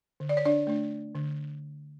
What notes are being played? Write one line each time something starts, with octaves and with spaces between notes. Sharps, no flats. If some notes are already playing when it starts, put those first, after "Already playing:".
D3
D5
C#5
D4 D5
A3 D4
D3